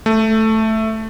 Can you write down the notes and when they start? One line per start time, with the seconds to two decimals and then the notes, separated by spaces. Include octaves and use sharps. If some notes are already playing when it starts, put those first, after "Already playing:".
0.06 A3